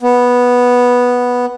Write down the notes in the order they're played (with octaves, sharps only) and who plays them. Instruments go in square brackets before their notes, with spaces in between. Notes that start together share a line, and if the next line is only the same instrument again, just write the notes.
[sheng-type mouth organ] B3